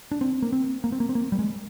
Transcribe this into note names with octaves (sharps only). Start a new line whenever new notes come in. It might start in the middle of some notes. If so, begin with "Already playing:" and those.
D4
C4
A#3
C4
A#3
C4
A#3
C4
A#3
G3
G#3